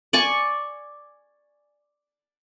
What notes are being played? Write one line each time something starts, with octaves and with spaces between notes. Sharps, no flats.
D5 G#5 C#6